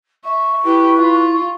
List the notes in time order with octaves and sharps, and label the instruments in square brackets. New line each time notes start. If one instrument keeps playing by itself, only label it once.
[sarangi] E5 [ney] C#6
[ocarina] E4 [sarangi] G4 [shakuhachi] B4
[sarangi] F4